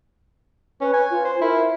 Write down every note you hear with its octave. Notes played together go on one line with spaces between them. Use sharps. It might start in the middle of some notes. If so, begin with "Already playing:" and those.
C#4 B4
G#5
F4
C5
E4 A#4